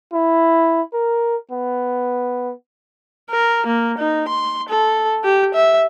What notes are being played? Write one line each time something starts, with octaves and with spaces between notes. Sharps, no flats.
E4
A#4
B3
A#4
A#3
D#4
C6
A4
G4
E5